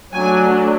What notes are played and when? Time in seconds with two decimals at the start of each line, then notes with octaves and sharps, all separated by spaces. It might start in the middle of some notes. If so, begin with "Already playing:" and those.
0.13 F#3 A3 D4 G#5